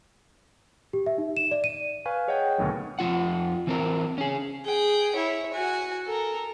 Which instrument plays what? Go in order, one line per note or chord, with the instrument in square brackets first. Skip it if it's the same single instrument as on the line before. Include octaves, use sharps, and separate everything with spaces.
[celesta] G4
E5
D#4
E7
D5
D#7
[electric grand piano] B4 F5 G#5 C#6
G#4 C#5 D#5 F#5 G5
D2 B2 D#3 F#3
[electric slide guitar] F2 E3 F4 F#5
E3 C4 A#4
C#4 G#4
[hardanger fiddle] G#4 G5
E4 C#5
F#4 G#5
A4 A#4